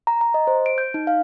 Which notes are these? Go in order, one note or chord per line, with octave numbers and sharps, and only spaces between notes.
A#5
A#5
D#5
C5
D7
G6
D#4
F5